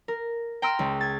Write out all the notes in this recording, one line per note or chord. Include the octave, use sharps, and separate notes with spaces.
A#4
G5 A#5 C6 E6 F6 D7
C#2
G#6 A6